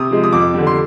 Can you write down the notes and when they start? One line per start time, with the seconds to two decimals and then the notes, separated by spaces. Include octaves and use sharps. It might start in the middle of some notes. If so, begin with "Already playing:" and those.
Already playing: C3 D#6
0.11 F3 G#3
0.24 D#6
0.33 F2 D6
0.54 D3 G3
0.67 C6